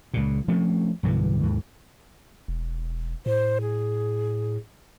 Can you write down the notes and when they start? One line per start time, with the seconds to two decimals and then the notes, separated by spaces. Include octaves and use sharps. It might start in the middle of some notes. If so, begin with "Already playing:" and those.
0.14 C#2 A#2
0.48 F3 A3 C4 C#4
1.03 B1 G2 D3 E3
1.43 D#2 G#2
2.48 E1
3.26 A2 C5
3.61 G#4